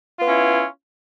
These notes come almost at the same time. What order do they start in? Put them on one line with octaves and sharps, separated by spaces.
F4 B3 C#4 E4